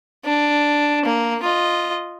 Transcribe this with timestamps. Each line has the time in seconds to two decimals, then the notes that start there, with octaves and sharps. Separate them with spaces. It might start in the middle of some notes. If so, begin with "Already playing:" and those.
0.25 D4
1.05 A#3
1.43 F4 D#5